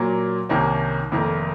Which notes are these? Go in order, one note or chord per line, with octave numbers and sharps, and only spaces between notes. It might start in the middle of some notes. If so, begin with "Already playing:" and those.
Already playing: A#2 F#3 A#3
C2 C3 D#3 A#3 C#4
F1 F2 D#3 A#3